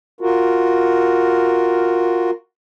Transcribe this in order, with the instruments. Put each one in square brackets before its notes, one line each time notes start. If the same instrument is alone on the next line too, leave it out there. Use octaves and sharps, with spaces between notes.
[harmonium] F4 F#4 A#4